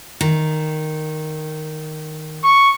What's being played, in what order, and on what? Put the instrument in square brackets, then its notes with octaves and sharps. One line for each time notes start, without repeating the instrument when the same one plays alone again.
[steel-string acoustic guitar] D#3
[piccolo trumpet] C#6